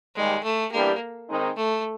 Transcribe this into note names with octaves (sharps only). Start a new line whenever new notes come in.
D#2 D#3 G3 G#3
A3
E3 G3 A#3 B3 D4 G4
D#3 G#3 C4 D#4
A3